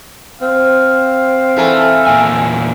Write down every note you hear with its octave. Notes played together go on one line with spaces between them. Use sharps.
C4 F5
E3 A3
E2 A#2 G#5